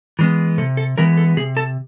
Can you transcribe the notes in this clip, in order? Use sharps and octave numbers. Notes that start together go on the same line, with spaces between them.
E3 G#3 B3
C3 A4
A4
E3 G#3 B3 A#4
A4
C3 G#4
A4